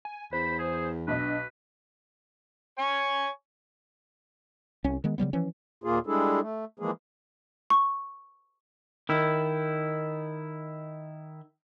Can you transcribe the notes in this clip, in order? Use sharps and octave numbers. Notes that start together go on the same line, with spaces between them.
G#5
E2 C5 B5
G#4
B1 D4 B4 D#5
C#5 G#5 C#6
C2 C#4
D#3 G#3 B3
C#3 F#3 G3 B3
E3 F3 C#4
D#2 A#2 A#3 F4 G#4
G3 G#3 D4 E4 G#4 A4
A3
E3 F3 G#3 A#3 G#4
C#6
D#3 E4